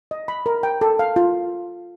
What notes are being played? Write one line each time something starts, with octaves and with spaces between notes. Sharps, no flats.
D#5
B5
A#4
G5
A4
F5
F4